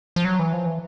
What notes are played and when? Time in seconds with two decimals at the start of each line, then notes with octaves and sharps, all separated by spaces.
0.16 F3
0.25 F#3
0.39 E3
0.53 F3
0.66 E3